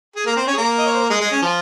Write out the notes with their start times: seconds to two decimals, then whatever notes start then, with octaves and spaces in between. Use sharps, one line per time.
0.16 G#4
0.26 A#3 A#4
0.36 C4 C5
0.47 C#4 C#5
0.53 G#4
0.58 A#3 A#4
0.78 D#5
0.86 C#5
0.94 C5
1.02 A#4
1.10 G#3 G#4
1.21 G#3 G#4
1.31 C#4
1.42 F3 F4